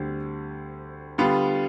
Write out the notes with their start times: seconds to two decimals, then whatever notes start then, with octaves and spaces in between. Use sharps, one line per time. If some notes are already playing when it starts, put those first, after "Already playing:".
Already playing: D2 D3 G3 C4
1.18 D3 G3 B3 F4